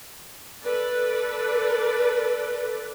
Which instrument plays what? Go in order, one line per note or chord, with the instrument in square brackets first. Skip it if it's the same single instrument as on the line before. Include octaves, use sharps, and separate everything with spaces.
[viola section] A4 B4 D5